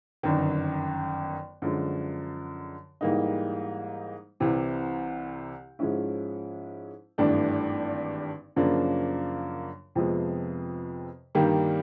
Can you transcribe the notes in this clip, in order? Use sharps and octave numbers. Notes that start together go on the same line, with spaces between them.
G1 F#2 D#3
F#2 D3 F3 G#3
G#2 E3 G3 A#3 D#4
C2 C3 E3
G#2 F3 G#3 C#4 E4
G#1 G2 E3 A3 D4
F#2 C#3 F3 A#3 D4
F2 C3 F3 G#3 B3
G2 D#3 G3 A#3